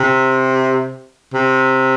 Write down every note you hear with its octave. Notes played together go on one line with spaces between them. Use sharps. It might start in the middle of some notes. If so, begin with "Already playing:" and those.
Already playing: C3
C3